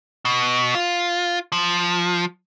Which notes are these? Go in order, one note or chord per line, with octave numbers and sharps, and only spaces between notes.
B2
F4
F3